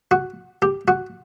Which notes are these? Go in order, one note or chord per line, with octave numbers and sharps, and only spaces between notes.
F#4
G4
F#4